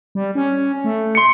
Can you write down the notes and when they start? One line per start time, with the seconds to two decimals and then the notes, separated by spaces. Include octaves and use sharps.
0.15 G3
0.35 C#4
0.84 A3
1.15 C6 C#7